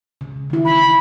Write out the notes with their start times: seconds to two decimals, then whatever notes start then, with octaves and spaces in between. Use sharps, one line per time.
0.21 C#3
0.50 D#3 E4
0.65 B5